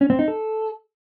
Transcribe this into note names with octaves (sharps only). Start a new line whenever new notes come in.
C#4
C4
D#4
A4